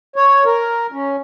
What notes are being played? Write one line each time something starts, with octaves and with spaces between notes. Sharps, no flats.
C#5
A#4
C#4